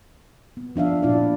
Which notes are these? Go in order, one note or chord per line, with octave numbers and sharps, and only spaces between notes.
B3
F3 D4 E5 F5
A#2 D4 E4 D5